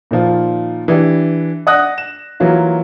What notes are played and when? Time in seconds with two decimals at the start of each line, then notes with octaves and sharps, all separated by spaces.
0.11 A#2 D#3 F3 F4
0.88 E3 D4 G4
1.67 D5 F#5 D#6 F#6 A#6
1.98 E7
2.40 E3 F#3 A#3 F4